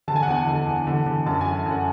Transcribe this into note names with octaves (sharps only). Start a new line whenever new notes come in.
D3 A5
G#5
F#5
E2 G#5
D3
E2
D3
D3
F#2 A5
G#5
E3
F#2
F#5